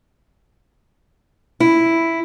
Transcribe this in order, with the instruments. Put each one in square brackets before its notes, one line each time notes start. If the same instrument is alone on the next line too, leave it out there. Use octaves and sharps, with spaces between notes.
[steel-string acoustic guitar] E4